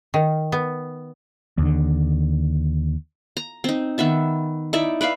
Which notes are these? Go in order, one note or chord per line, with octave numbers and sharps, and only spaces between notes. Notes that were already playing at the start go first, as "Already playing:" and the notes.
D#3
B3
D#2 D3
A#5
C4 D#4
D#3 B3 E5 A5
D#4 E4 D5 E5
B4 D5 E5 F5